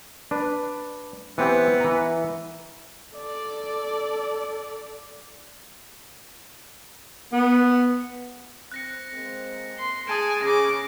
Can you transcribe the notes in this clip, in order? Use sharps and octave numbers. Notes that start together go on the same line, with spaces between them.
D4 B4
E3 B3 C4 G4
E3 A#5
A4 D5
B3
C4 F#6 A#6 C#7
G#3 A#3 C4
C6
G#4 G#5 A5 D#6 D7
C#3 D6 A#6